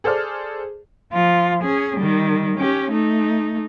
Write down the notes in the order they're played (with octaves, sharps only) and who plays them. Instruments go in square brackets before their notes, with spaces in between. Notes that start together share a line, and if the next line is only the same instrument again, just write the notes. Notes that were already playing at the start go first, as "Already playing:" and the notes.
[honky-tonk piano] G#4 A4 C5 D5 F6
[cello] F3 F4
C#4 G#4
D#3 G3
C#4 G4
A3 D#4